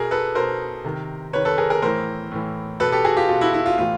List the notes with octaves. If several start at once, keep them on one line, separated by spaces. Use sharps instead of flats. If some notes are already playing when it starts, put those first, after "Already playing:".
Already playing: B2 G#4 A#4
A4 B4
B2 A#4 C5
C3 D#3
C3 D#3 B4 C#5
A4 B4
G#4 A#4
G#4 A#4
A2 E3 A#4 C5
A2 E3
B2 A4 B4
G4 A4
F#4 G#4
F4 G4
B2 F4
E4 F#4
E4
F4
A2 E3 F4